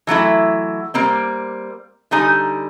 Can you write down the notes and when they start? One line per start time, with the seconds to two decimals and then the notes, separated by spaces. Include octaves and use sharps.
0.07 E3 F#3 A3 E4
0.94 G3 A#3 C4
2.11 D3 G3 D#4 G#5